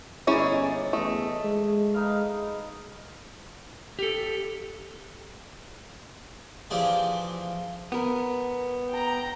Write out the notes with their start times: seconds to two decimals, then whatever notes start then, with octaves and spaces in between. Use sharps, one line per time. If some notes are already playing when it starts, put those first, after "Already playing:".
0.27 G1 C#4 D#4 E4 G#4 D5
0.93 E2 A3 D#5
1.45 G#3
1.94 D#4 B4 F5
3.99 G4 A4
6.71 E3 F3 E4 G4 G#4 D5
7.92 B3 A#4
8.90 G5 A#5